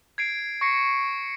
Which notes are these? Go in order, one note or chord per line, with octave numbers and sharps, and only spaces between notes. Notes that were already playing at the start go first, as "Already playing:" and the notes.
G#6 C7 D7
C#6 A#6 C7 C#7